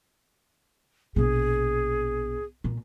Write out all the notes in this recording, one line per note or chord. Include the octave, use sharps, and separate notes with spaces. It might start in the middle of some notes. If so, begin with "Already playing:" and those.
A#1 B2 G#4
A#2